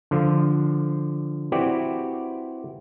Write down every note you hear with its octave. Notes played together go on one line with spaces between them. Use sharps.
D3 F3
C4 E4 F#4 G4 B4 D5